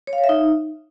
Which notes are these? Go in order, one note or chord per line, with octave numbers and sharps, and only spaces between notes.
C#5
F5
C#5
E5
D#4